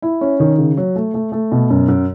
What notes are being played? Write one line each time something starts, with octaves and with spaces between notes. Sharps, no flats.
E4
C#4
D#3
C#3
F#3
A3
A3
A3
B2
F#2
F#2